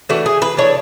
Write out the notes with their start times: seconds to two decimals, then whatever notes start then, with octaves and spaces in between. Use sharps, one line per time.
0.09 E3 A3 D4 F#4
0.26 G#4
0.42 B4
0.57 E3 A3 D4 C#5